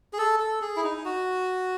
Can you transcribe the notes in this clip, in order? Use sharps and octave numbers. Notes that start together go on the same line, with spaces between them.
G#4
A4
A4
G#4
E4
D#4
F#4